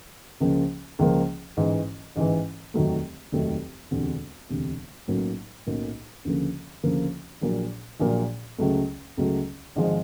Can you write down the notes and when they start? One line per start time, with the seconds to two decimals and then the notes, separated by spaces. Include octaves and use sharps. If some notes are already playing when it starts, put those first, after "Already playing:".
0.40 C#2 C#3 F3 A#3
0.99 C#2 C#3 F3 A#3
1.57 A1 G#2 E3
2.16 A1 G#2 E3
2.74 F1 D#2 D#3 F#3 A3
3.32 F1 D#2 D#3 F#3 A3
3.91 E1 D2 C3
4.49 E1 D2 C3
5.07 B1 A2 F#3 A#3 C#4
5.66 B1 A2 F#3 A#3 C#4
6.25 D2 C#3 F3 A#3
6.83 D2 C#3 F3 A#3
7.42 A#1 A#2 F#3 A#3
8.00 A#1 A#2 F#3 A#3
8.58 C#2 C#3 F#3 A3
9.17 C#2 C#3 F#3 A3
9.76 G#1 G#2 F3 G#3